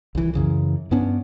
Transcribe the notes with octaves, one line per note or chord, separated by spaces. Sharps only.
C2 E3
F#2 C#3 E3
G2 B3 C#4 D4